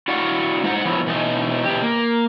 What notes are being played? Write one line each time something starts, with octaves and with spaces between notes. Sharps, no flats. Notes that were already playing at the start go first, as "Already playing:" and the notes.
E4 F#4 D5 F5 F#5
G#3 D#4 C5 F#5
F3 F#3 B3 E4
B2 E3 D#4
B2 G4
A#3